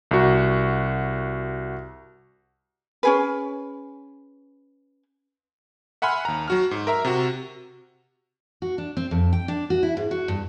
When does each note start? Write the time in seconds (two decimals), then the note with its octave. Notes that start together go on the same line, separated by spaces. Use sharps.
0.11 C2 F#4
3.03 C#4 G#4 B4
6.02 E5 F#5 G#5 B5 C6 F6
6.25 D#2 A#5
6.48 F#3 F#4 F6
6.71 G#2
6.87 A#4 E5 A#5
7.05 C3 F#4
8.62 F#4
8.78 D4
8.97 C4
9.11 F2
9.33 G5
9.48 D4
9.70 F#4
9.83 E4
9.97 G#2
10.11 F#4
10.28 G2